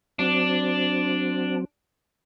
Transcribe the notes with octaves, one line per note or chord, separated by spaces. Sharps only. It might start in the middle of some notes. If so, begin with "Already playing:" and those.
F#3 C4 D4